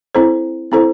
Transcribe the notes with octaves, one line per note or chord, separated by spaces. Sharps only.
C4 E4 A4 C5
C4 E4 A4 C5